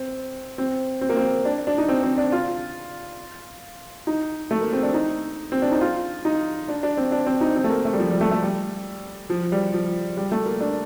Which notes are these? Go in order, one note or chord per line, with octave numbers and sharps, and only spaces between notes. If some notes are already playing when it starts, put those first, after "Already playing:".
Already playing: C4
C4
C4
A#3
C4
D4
D4
D#4
C4
C4
D4
F4
D#4
A3
A#3
C4
D4
D#4
C4
D4
D#4
F4
D#4
D4
D4
C4
D4
C4
D#4
C4
A3
A#3
A3
G3
F3
G3
A3
A3
G3
F3
G3
F3
G3
A3
A#3
D4